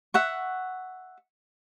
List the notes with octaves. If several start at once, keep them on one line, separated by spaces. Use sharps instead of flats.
E5 F#5 C#6